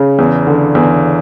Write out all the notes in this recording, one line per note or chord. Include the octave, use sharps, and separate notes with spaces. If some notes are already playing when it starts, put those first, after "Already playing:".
Already playing: C#3
E2
D3
E2